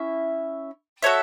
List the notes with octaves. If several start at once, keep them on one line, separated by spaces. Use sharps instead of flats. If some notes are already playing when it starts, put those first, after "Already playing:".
Already playing: C#4 E4 E5
F#4 A4 C#5 E5